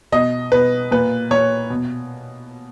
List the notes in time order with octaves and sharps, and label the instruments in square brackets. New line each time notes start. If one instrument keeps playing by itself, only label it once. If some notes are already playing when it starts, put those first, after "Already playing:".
[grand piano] B2 D#5
B2 B4
A#2 B4
A#2 C#5
B2